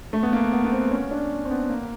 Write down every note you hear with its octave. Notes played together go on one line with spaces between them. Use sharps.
A3
B3
A#3
B3
B3
C4
C#4
D4
C4
B3
A#3